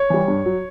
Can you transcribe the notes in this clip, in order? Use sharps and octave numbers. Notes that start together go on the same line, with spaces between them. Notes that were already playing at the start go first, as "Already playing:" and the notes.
Already playing: C#5
E3 G3
G2
F#3